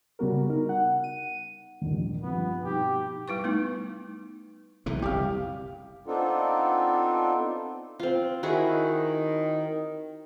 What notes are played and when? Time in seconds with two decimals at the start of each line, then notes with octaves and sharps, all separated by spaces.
0.19 C#3 G3 B3 F#4 A#4
0.49 D#4 A#4
0.69 F#5
1.04 D#7
1.81 A#1 D#2 D#3
2.23 G2 F3 B3 C4
2.63 B2 D#4 G4
3.28 G3 E4 B4 C#6
3.44 A3 B3 D#4
4.86 B1 C3 E3
5.02 F#1 C2 G4 F5
6.07 B3 C4 D4 D#4 F4 A4
7.99 C4 F4
8.43 D#3 E4 F#4 G#4